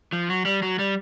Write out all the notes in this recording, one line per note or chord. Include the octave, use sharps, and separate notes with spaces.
F3
F#3
G3
F#3
G3